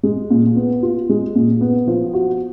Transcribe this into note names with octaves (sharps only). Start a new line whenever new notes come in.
G#3
A#2
B3
F4
G#3
A#2
B3
F3
F#4